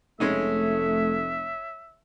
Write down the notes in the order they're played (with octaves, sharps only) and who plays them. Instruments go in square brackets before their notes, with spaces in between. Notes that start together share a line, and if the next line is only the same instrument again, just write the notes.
[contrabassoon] F1 [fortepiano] G#3 C#4 D#4 [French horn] A3 [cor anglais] E5